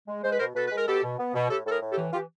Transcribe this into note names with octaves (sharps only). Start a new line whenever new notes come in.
G#3
G#3 C5
B4
B2 A#4 C5
B2 A4 B4
G#3 B4
A#4
B2 G4 A4
B2
B3
B2
A2 G4 A4
A2 A4
G#4 A#4
A2
G4 A4
E3
E3 F4 G4